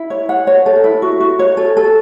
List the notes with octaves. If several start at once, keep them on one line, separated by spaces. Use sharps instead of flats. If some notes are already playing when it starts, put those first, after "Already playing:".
Already playing: E4
C#5
F#5
C#5
A4
E4
F#4
F#4
C#5
A4
A4